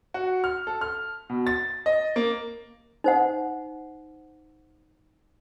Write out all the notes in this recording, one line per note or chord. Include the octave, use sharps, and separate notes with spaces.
F#4
F6
A4
F6
B2
A6
D#5
A#3
D#4 C5 F#5